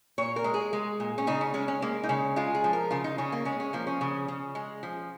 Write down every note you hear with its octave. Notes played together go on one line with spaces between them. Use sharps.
A#2 C#5
A#4
G#3
G#4
G#3
A#2
C#4
C#3 D#4
C#4
G#3 C#4
C#4
G#3 A#3
D#4
C#3 C#4
G#3 F4
G#4
F3
A#4
C#3 F4
D#4
C#3 C#4
A#3
G#3 C#4
C#4
F3 A#3
C#4
C#3
C#3
G#3
F3